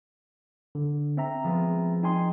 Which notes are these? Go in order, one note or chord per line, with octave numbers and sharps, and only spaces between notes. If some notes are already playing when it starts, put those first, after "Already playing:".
D3
C4 E5 A#5
F3 G#3 B3
D#4 D#5 G5 G#5 C6